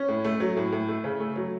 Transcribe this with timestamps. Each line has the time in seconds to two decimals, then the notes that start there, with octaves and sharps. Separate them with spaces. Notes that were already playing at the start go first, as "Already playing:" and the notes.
Already playing: C#4
0.08 A2
0.24 A3
0.40 F#3
0.57 A2
0.72 A2
0.88 A3
1.04 C#3
1.20 A3
1.36 F#3